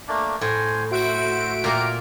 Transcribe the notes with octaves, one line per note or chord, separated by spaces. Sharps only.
A3 A#3 D4
A2 C5 G#5
F#4 C5 E5 D7
A#2 A#3 G4 A#5